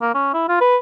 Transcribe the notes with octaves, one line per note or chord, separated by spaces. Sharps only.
A#3
C#4
E4
F4
B4